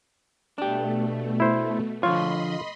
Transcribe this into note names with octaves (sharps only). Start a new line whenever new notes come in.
B2 A3 D4 G4
E4 C5
D3 F3 F4 C#5 D#5 B5 C6